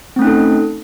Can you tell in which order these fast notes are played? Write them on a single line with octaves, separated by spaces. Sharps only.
C4 A3 C#4 D#4 A4